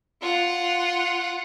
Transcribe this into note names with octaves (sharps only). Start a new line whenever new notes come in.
F4 F#5